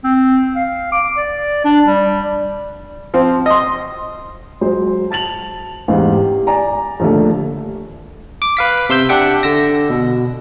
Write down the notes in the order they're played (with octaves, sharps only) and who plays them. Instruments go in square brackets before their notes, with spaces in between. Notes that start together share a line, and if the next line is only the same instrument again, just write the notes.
[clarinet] C4
F5
D6
D5
D4
G3
[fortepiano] F3 C4
D#5 C6
[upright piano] F#3 G#3 C5
A5 A6 F7 F#7
A1 E2 G#2 D#4 G4 F5
G4
D5 G#5 A#5
A#1 D#2 D3 A3
[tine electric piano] D6
B4 F5 B6
C3 C6 E6 G6
D4 G4 E5 F#5 G5
D3 E6 A#6
B2